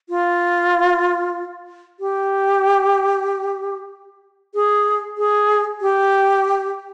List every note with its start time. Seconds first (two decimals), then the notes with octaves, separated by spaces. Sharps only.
0.09 F4
2.00 G4
4.54 G#4
5.18 G#4
5.81 G4